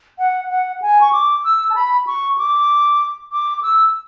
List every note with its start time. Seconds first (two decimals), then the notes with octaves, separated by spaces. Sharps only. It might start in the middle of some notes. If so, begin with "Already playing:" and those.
0.18 F#5
0.50 F#5
0.82 G#5
1.01 C#6
1.13 D6
1.44 E6
1.70 A5
1.75 B5
2.07 C#6
2.38 D6
3.32 D6
3.58 D6
3.63 E6